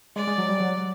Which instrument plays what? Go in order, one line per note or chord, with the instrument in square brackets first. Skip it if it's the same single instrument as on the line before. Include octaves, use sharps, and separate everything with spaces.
[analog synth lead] G#3 [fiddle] D5
[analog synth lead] G#3
F#3
G3
F#3